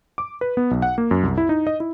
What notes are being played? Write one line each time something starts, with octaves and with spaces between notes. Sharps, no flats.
D6
B4
B3
B1
F#5
A#3
F#2
C2
E4
D#4
D#5
E4